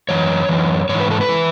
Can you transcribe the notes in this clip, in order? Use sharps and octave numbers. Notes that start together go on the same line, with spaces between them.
F#2 E3 C#5
F#2 E3
G#2 E3 C#5
B4
A4
B4
E3